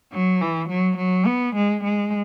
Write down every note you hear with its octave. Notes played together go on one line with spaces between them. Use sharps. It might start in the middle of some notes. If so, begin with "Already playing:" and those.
F#3
E3
F#3
F#3
B3
G#3
G#3